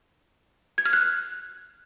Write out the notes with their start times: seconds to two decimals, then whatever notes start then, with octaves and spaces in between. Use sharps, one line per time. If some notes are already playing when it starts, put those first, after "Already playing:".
0.78 G#6
0.86 F6
0.93 F#6